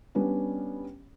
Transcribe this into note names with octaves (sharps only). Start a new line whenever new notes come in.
G3 B3 C#4 D4